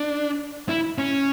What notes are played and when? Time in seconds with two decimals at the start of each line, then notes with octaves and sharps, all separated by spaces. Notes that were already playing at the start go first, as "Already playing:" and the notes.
Already playing: D4
0.69 E4
0.98 C#4